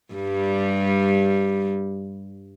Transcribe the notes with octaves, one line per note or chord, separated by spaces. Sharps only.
G2 G3